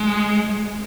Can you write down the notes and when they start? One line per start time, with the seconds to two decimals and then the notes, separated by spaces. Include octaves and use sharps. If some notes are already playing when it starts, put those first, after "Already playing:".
Already playing: G#3